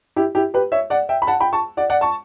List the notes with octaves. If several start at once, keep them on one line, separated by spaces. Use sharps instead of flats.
E4 G4
E4 G4
G4 B4
C#5 E5
D5 F#5
E5 G5
B5
F#5 A5
G5 B5
A5 C#6
D5 F#5
D5 F#5
A5 C#6